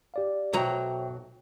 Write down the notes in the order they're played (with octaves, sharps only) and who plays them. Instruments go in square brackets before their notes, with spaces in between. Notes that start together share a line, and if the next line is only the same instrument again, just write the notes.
[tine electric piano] G4 D5 F5
[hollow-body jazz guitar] B1 F#3 A#5 [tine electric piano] C5 E5 G5